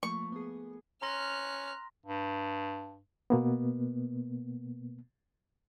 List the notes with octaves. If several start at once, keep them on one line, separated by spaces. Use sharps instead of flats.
F3 A3 A#3 C#6
B3 G#4
C#4 A#5 C6 F6 F#6 A#6
G2
B2 A#3 B3